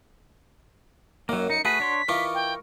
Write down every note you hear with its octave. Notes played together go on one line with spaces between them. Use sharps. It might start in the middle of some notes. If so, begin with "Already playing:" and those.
F#2 D#3 F#3 A#3
D#4 C#7
A3 F#4 G#4 B4 B6
D4 C#5 C6
E3 D#4 F4 A#4 C#6 D6
G5